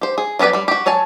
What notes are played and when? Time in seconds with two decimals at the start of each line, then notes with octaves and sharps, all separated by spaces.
0.01 G4 C5
0.18 G#4
0.39 F#3 B3 G4 B4 D5
0.53 G3 B5
0.68 F#4 G4
0.86 F#3 C#5 G#5 A5